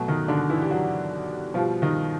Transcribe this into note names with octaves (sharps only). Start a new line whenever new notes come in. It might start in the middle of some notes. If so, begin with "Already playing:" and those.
Already playing: B2 F#3 A3
D#3 D#4
D3 D4
E3 E4
G4
F#3 F#4
B2 F3 G3 F4
D#3 D#4